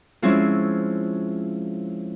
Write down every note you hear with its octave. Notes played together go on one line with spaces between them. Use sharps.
F3 G#3 C4 C#4 E4